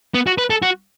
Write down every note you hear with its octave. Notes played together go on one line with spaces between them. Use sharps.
B3
F#4
B4
A4
F#4